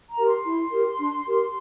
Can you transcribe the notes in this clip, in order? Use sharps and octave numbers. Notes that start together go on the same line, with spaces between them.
A#5
G4 A#4
C6
E4
G4 A#4
D4
G4 A#4